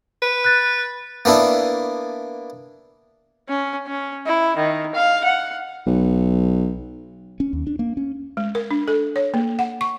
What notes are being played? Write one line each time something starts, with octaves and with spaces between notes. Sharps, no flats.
B4
F#6 A6
A#3 B3 D4 E4
C#4
C#4
E4
D#3
F5
F#5
B1
C#4
D#2
D4
A#3
C#4
G#3
A#4
D4
A4
C#5
A#3
F#5
C#6